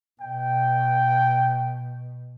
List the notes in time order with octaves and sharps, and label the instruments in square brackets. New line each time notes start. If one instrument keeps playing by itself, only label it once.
[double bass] B2 [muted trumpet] G5